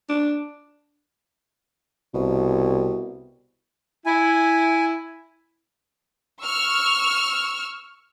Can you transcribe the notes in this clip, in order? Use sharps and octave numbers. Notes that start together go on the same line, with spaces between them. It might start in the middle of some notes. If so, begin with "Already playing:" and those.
D4
C2 B2
E4 G#5
C#6 E6 F6